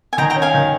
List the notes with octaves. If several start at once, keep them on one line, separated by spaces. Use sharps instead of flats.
G#5
D#3 G5 A#5
G5 A#5
C#4
F5 G#5
D#3